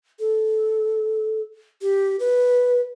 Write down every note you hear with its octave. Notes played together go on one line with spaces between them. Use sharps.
A4
G4
B4